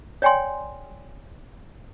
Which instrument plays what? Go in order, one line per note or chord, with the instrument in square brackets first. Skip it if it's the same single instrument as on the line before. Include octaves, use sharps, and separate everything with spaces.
[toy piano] C#5 D5 G5 G#5 C6